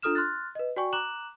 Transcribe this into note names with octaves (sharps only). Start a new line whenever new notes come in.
D4 F4 A4 D#6 F6 E7
C6 F6 F#6 A6
B4 D#5
F#4 D5 G5 G#5 C#6
A#5 D6 F#6 E7 F#7